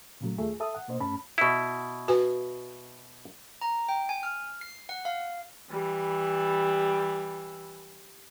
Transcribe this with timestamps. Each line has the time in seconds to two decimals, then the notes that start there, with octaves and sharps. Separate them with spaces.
0.21 A#2 C#3 F#3 A3
0.38 D#2 A3 F4 G#4
0.60 A4 E5 A5 D#6
0.75 F#5
0.88 B2 A#3 D4 C5 D#5
1.00 G2 A3 C#4 A5 B5
1.38 B2 E4
2.08 F#4 B4 G#5
3.61 A#5
3.89 G5
4.09 G#5
4.23 F6
4.61 C7
4.89 F#5
5.05 F5
5.70 E3 G3